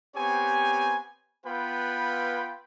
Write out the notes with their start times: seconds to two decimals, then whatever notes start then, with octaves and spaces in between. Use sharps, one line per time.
0.15 B3 C4 G4 C#5 G#5
1.45 B3 F4 B4 F5 G5 B5